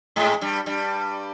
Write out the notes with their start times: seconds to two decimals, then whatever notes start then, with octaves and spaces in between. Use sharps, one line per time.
0.16 G#2 G#3
0.41 G2 G3
0.66 G2 G3